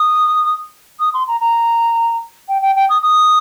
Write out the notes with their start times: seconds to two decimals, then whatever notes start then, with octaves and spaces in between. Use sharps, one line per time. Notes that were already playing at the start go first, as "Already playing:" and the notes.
Already playing: D#6
1.00 D#6
1.14 C6
1.27 A#5
1.40 A#5
2.49 G5
2.62 G5
2.76 G5
2.89 D#6
3.02 D#6